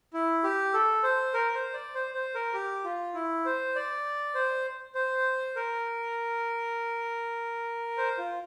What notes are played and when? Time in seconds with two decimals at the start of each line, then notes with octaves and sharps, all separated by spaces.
0.13 E4
0.44 G4
0.74 A4
1.03 C5
1.34 A#4
1.54 C5
1.74 D5
1.94 C5
2.14 C5
2.35 A#4
2.54 G4
2.84 F4
3.14 E4
3.45 C5
3.75 D5
4.35 C5
4.95 C5
5.56 A#4
7.98 C5
8.18 F4